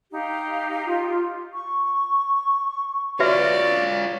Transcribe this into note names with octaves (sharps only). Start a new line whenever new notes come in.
D#4 G4 F5
F4
C#6
F4 F#4 B4 C#5 D5 E5